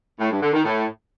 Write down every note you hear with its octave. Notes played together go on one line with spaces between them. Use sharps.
A2
G2
D3
D#3
A2